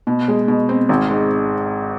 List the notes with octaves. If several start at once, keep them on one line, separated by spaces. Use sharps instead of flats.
B2
G#3
B2
C4
G#1
G#2